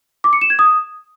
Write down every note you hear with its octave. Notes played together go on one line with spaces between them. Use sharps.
D6
C#7
E7
G#6
D#6